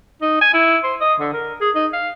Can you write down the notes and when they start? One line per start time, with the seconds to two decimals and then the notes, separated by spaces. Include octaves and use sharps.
0.22 D#4
0.41 G#5
0.54 E4
0.84 C5
1.00 D#5
1.20 D3
1.33 A#4
1.61 G#4
1.75 D#4
1.93 F5